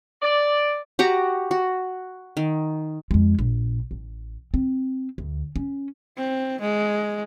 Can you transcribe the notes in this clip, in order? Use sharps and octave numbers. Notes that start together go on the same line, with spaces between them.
D5
F#4 G4 A#5 C#6
F#4
D#3
F2 G#3
A#1
A1
C4
D2
C#4
C4
G#3